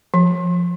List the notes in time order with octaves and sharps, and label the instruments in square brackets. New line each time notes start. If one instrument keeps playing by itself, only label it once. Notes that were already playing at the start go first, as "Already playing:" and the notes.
[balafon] F3